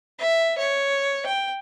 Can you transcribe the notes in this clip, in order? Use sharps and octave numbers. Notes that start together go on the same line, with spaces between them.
E5
C#5
G5